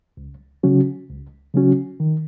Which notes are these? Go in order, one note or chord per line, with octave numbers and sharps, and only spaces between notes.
C#2
C#3 F#3 C#4 F#4
C#2
C#3 F#3 C#4 F#4
D#3